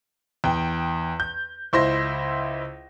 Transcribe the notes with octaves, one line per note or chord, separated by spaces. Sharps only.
E2 G5
G6
C#2 E4 C5 C6 A#6